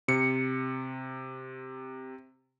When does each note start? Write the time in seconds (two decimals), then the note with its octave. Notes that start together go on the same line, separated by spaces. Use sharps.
0.08 C3 C#7